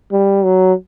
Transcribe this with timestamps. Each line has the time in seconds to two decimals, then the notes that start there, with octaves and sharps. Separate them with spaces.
0.12 G3
0.44 F#3